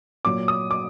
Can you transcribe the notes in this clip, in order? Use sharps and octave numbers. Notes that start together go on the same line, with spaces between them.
A#2 F#3 D6
D#6
D6